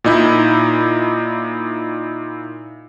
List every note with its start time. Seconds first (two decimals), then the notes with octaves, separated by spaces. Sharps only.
0.04 A#2 D#4 E4